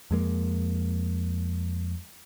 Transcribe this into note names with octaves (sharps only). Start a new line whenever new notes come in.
F2 G#3 A#3